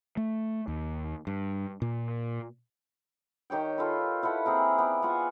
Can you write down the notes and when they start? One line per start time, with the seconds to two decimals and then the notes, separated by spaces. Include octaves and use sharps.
0.17 A3
0.68 D#2
1.27 G2
1.82 A#2
3.50 D#3 G4 C#5 G5
3.78 F4 A4 B4
4.23 E4 A4 B4 F#5
4.46 A#3 C4 G#4 A#4
4.78 B3 D5
5.02 F4 E5 F#5 G#5